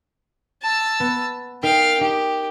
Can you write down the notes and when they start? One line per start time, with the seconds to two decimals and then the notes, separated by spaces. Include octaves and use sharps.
0.62 A5 E6
1.00 B3
1.63 D#4 A#4 F5 G5 B6
2.01 D#4 G4